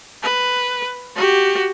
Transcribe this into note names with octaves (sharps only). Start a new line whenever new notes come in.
B4
F#4 G4